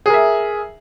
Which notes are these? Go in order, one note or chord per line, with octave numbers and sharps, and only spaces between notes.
G#4 A#4 E5